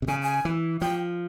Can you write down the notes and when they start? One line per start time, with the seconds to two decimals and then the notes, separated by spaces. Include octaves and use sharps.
0.02 C3
0.08 C#3 G#5
0.22 G#5
0.45 E3
0.81 F3 G5